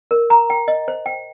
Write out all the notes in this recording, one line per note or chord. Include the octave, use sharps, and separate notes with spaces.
A#4
A#5
G5
D#5
C5
G5